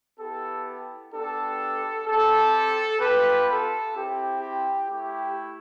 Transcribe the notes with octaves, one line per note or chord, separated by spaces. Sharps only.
B3 E4 G4 A4
B3 D4 G4 A4
C4 G4 A4
B3 F4 G4 B4
A4
C4 E4 G4
G4
A3 E4 G4